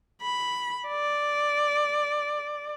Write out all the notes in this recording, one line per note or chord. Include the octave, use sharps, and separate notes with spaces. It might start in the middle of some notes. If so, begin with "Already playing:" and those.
B5
D5